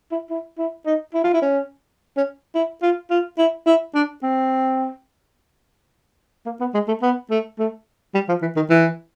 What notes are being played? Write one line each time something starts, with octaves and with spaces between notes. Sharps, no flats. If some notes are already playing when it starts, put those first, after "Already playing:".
E4
E4
E4
D#4
E4
F4
E4
C#4
C#4
E4
F4
F4
E4
E4
D4
C4
A#3
B3
G#3
A3
B3
A3
A3
G3
F3
E3
D#3
E3